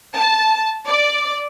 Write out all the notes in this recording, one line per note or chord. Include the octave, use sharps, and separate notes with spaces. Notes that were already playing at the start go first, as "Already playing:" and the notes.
A5
D5